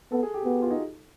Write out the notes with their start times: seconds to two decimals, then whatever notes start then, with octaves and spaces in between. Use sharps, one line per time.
0.12 B3 A4
0.23 G#4
0.34 G4
0.45 B3 F#4
0.62 F4
0.71 D#4